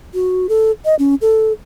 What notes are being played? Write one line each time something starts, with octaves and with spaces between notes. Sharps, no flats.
F#4
A4
D#5
C#4
A4